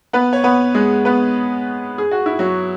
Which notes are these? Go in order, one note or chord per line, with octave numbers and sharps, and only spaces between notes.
B3 B4
C#5
B3 B4
G#3 G#4
B3 B4
G#4
F#4
E4
F#3 F#4